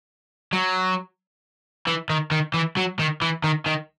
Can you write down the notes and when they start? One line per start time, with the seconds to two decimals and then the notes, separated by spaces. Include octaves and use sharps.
0.53 F#3
1.87 E3
2.10 D#3
2.31 D#3
2.54 E3
2.77 F#3
2.99 D#3
3.22 E3
3.44 D#3
3.66 D#3